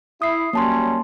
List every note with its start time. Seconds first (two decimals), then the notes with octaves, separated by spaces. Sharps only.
0.22 E4 D#6 C7
0.53 F#3 G3 A#3 C#4 A5 C6